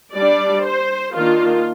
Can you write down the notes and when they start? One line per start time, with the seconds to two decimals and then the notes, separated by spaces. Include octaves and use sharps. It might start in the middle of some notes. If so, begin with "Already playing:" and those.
0.14 G3 D4 D5
0.65 C5
1.15 D#3 A#3 D4 F4